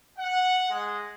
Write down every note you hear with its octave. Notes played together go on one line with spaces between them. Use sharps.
F#5
G#3